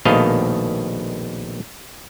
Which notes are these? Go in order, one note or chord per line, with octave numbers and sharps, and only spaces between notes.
A#1 B2 D#3 A3 D#5 F5